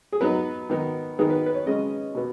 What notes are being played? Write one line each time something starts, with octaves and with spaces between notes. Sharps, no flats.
G#4
F#3 B3 D#4 B4
D#3 B3 D#4
D#3 B3 D#4 G#4
B4
B4
C#5
C#3 G#3 C#4 D#5
B2 B3